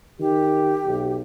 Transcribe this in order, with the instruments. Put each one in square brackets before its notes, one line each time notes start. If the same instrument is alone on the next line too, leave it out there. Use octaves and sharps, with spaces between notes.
[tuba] D#3 [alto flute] G4
[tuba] B1